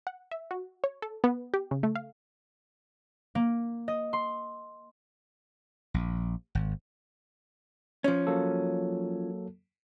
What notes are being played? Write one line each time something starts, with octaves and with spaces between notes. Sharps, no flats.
F#5
E5
F#4
C#5
A4
B3
G4
C#3
A3
F5
A#3
D#5
C6
A#1
G#1
F3 C#4
F#3 A#3 A4